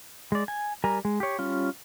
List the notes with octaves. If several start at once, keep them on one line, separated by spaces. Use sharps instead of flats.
G#3 D5
G#5
G3 A#4 G#5 A#5
G#3
G4 C#5
G3 C#4 F4